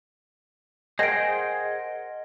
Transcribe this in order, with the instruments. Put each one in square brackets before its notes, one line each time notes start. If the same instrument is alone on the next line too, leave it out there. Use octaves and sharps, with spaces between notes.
[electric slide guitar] G#4 C5 G5 [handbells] A#4 F#5 [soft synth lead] D#5 [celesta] A#6 D7